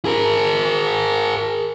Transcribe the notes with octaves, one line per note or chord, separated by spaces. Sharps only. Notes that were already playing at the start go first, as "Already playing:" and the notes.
G#4 A#4